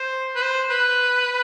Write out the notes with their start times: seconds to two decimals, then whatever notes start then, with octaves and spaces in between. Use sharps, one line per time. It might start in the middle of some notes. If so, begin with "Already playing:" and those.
Already playing: C5
0.36 B4
0.43 C5
0.70 B4